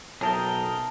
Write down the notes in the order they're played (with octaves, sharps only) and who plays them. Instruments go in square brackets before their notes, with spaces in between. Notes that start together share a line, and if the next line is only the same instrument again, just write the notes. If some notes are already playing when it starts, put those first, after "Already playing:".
[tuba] B1 [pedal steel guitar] G#4 A#4 G5 [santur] E5 A5 D#6